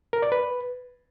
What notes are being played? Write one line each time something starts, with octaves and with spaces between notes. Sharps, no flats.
A#4
D5
B4